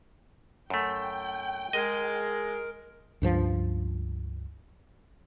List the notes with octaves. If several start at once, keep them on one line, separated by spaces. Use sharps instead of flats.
F#2 A3 G5
G#3 A#4 D#5
C#2 G2 F3